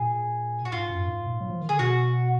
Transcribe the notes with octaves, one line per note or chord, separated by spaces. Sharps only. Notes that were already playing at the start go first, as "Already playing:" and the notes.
Already playing: A#2 G#4
F#4
G#2 F4
F#2
G#2
A#2
F#3
F3
D#3
D3 G#4
B2 F#4